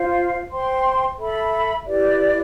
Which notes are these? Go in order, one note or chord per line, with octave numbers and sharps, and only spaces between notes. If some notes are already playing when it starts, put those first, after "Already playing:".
Already playing: F4 C5 F5
C5 G5 C6
A4 E5 B5
E4 G4 B4 D5